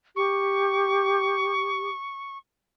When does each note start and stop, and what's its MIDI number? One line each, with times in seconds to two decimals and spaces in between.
0.16 1.90 67
0.16 2.38 85